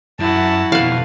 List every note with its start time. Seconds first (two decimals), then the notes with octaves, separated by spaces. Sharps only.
0.20 F#2 E4 F#4 A5
0.72 F2 B2 B4 F5